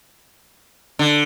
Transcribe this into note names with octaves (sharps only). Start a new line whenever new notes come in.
D3